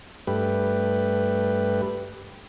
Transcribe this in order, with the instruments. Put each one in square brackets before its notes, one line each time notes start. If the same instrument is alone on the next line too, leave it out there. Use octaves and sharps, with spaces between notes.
[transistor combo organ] G2 A3 G4 B4